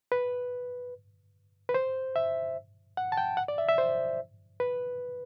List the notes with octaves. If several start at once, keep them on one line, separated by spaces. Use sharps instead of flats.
B4
B4
C5
E5
F#5
A5
G5
F#5
D5
E5
E5
C5
B4